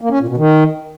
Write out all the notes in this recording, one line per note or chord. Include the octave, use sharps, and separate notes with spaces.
A#3
C#4
A#2
B2
D#3